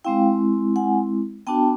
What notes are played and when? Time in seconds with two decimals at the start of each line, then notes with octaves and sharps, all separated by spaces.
0.04 G#3 C4 E4 F5 G5
0.76 F#5 G#5
1.47 B3 D4 F#4 G5 A5